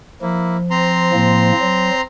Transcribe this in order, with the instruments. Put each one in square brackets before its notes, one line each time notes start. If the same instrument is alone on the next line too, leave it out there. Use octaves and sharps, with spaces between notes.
[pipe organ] F3 [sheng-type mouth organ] A#3 E4
[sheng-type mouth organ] C4 A#5 C6
[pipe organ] A2 F3 A#3
F#3